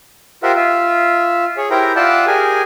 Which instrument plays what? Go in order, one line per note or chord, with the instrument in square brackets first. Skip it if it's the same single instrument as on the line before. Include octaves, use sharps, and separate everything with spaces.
[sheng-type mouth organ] F4 G4 A#4 C5 E5 F#5
F4 E5
G#4 C#5
E4 G4 A#4 C5 G5 A#5
F4 D5 E5 F#5 G5 A5
G4 G#4 A#4 G#5